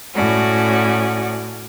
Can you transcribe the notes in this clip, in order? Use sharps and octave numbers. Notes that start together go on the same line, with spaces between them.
A2 C#4 F#4 D5